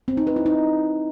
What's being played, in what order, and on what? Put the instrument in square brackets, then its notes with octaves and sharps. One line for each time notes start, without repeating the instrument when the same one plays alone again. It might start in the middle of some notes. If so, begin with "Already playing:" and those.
[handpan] C4
D#4
B4
E4
D#4